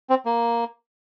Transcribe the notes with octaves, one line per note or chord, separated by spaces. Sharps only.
C4
A#3